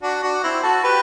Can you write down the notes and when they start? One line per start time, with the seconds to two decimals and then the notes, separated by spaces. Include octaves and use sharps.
0.03 D4 F#4
0.23 D4 F#4
0.43 C4 E4
0.63 F#4 A4
0.84 G4 B4